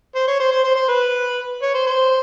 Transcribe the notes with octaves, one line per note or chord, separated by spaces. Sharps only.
C5
C#5
C5
C5
C5
C5
B4
C#5
C5
C5